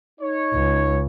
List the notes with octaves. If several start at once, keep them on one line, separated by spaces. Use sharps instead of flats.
D#4 C#5
C#2